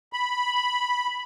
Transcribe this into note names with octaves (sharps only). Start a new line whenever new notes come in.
B5